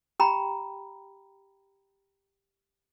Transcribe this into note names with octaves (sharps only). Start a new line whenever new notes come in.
G4 G5 A#5 B5